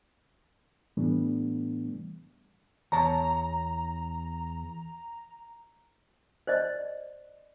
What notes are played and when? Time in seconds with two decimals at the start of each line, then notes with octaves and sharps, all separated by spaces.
0.97 A2 E3 G3 A3 B3 D4
2.92 E2 C#5 A5 A#5
6.47 C5 D5 D#5